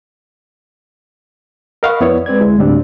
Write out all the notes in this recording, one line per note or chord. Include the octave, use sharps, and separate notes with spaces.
A#4 D#5 F5 F#5 B5 C#6
F2 B3 E4 C#5 D5
G#3 C4 B4 D5 G#6
D2 G#3 E4
D2 A2 G3 C4 D4